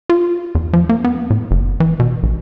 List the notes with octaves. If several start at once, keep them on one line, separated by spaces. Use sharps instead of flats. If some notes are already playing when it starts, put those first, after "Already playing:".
F4
E2
F3
A#3
B3
A2
F#1
E3
B2
A#1